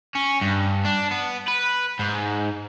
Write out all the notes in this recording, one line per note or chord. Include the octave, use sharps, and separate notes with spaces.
C#4
G2
D4
B3
B4
G#2